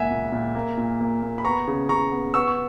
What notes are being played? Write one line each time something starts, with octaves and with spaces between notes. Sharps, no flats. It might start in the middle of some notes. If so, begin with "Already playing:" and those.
Already playing: C#2 A#2 A#3 E5 F#5 G#5
A#2
A#2
A#3
A#2
A#3
A#3
B5
B3 A#5 C#6
C#3
C#3 A#5 C#6
B3
B3 C#6 E6
C#6